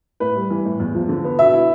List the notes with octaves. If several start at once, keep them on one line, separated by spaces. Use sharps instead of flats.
A2 B4
G3
E3
A2
E2
F3
D3
B3
B2 E5
E4